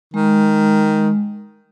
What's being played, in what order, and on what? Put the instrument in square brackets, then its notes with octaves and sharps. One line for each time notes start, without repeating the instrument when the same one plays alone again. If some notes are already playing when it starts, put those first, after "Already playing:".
[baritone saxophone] D#3 [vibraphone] G#3